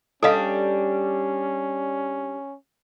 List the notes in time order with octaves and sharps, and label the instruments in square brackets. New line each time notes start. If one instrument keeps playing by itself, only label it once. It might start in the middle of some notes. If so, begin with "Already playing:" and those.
[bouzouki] G3 D4 [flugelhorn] C#4 [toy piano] A4 D#5 F5